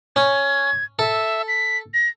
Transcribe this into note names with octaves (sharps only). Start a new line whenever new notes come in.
C#4 G#6
A4 E5
B6
A#6